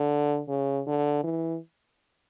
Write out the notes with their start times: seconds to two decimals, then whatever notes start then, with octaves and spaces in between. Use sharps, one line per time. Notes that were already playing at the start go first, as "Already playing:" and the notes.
Already playing: D3
0.48 C#3
0.87 D3
1.24 E3